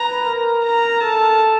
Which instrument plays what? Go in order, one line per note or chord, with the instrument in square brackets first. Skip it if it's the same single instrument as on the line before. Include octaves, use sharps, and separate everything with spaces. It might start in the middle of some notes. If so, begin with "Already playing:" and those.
Already playing: [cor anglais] B4 [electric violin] A#5
[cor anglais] A#4
[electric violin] A#5
[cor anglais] A4 [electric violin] A5